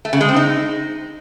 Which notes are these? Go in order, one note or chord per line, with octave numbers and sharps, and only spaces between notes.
A3
C#3
G#3
C4
D#4